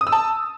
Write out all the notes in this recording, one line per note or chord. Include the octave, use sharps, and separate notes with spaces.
D#6
E6
A5